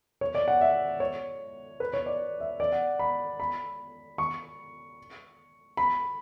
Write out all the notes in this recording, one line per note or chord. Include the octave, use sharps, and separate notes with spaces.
C#5
D5
F#5
E5
C#5
B4
C#5
D5
E5
D5
F#5
B5
B5
C#6
B5